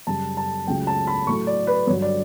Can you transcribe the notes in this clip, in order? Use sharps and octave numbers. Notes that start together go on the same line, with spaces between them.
F#2 C#3 G3 A5
A5
C#2 C#3 F#3 A3 G5
A5
B5
A2 F#3 A3 C#6
D5
B4
G2 D3 F#3 C#5
D5